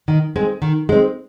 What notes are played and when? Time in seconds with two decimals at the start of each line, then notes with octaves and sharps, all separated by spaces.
0.08 D#3
0.36 G#3 C4
0.62 D#3
0.89 G#3 C4